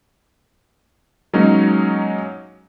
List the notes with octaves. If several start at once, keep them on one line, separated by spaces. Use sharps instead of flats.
F#3 G#3 A#3 C#4 D#4